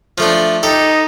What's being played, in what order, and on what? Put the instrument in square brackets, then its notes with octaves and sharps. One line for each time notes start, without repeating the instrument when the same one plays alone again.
[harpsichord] F3 A3 D4
[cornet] D#4 [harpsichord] G4 A4